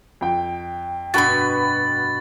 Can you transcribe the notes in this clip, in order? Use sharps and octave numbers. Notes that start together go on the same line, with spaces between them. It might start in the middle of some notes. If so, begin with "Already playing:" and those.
F2 G5
G2 B2 F#4 B4 A6